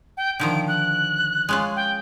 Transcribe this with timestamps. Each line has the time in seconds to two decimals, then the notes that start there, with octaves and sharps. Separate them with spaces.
0.17 G5
0.40 D3 D#3 F3 D7
0.68 F#6
1.49 G#3 C#4 F4
1.76 G5